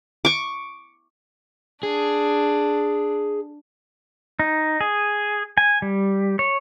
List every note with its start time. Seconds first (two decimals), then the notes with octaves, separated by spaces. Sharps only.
0.25 C#6 D6
1.83 D4 G#4
4.39 D#4
4.81 G#4
5.58 G#5
5.82 G3
6.39 C#5